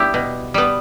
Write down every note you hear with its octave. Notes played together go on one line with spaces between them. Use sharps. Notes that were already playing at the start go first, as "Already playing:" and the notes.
Already playing: G3 B3 E4 G4
B2
G3 B3